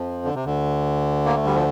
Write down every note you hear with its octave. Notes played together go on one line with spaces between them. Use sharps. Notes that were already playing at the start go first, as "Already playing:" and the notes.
Already playing: F2 F3
D3
C3
D2 D3
A#3
A3
G3
F3